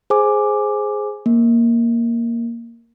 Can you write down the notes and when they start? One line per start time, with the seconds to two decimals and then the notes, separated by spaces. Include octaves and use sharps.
0.10 G#4 C5 G#5 D6
1.26 A#3